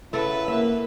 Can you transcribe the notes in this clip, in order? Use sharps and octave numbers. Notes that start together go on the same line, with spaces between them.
C#3 B3 E4 A4 B4 E5
A#3 E5